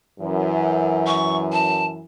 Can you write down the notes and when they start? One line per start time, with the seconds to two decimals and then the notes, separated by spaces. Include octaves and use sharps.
0.20 F#2 E3
1.07 C#6
1.52 A5